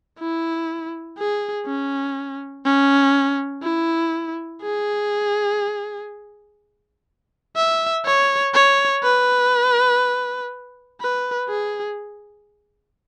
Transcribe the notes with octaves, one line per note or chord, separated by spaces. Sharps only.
E4
G#4
C#4
C#4
E4
G#4
E5
C#5
C#5
B4
B4
G#4